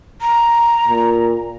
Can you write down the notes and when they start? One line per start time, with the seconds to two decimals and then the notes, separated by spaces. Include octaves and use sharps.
0.21 A#5
0.88 A#2